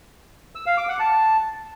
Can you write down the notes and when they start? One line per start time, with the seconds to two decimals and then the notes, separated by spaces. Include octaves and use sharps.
0.55 E6
0.66 F5
0.77 D6
0.89 F#5
1.00 A5